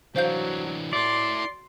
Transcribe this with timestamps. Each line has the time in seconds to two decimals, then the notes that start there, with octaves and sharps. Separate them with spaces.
0.16 E3 F#3 D4 C5 F5 G6
0.93 E4 A4 D5 C6